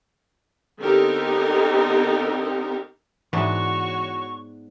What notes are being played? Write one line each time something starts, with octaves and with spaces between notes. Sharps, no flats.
D3 B3 C4 D#4 G4 A#4
G#2 E3 B3 D4 F#4 C#5 C#6